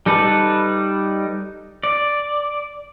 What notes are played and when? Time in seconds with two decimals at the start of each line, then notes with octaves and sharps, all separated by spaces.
0.06 G3 D#4 A4 B4 D5
1.83 D5